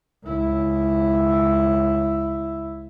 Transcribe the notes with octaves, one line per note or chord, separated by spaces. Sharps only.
C#2 E4